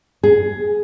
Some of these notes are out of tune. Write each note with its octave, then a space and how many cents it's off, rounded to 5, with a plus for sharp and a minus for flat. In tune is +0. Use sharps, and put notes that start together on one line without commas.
G#4 +10